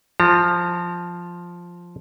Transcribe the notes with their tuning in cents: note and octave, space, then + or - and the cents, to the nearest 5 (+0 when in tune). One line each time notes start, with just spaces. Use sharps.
F3 +0 A#5 -35